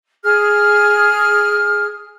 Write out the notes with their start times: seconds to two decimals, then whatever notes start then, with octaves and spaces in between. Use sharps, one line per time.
0.23 G#4 F6